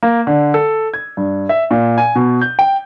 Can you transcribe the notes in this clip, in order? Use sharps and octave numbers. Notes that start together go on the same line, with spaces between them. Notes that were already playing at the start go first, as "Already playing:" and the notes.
A#3
D3
A4
G#6
G2
E5
A#2
G#5
B2
G6
G5